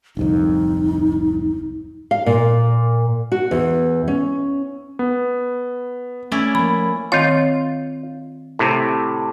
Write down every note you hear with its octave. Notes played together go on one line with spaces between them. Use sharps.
D1 C2 F2 D#4
F5
A#2
F#4
E2
C#4
B3
A3 C#4 E4 D5
F3 A#3 B5
D#3 C4 F4 C#5
A2 C3